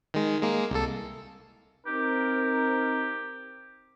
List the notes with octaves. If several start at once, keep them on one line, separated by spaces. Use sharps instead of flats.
D#3 G#3
G#3 A#3
C2 A4
C4 D#4 G4 A#4